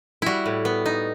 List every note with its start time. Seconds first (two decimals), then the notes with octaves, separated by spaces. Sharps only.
0.22 G3 E4 F#4
0.46 A2
0.65 B3
0.86 D#4